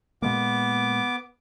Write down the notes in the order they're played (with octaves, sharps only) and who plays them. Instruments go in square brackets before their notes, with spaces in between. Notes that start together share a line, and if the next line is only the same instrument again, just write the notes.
[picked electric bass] A#2 G#3 A#3 [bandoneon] B3 D6